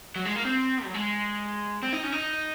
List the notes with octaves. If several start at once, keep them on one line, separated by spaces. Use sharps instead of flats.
F#3
G#3
A#3
C4
F#3
G#3
C4
D#4
C#4
D#4